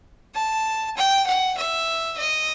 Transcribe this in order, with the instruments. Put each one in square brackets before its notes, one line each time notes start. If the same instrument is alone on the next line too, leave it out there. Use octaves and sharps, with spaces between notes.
[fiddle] A5
G5
F#5
E5
D#5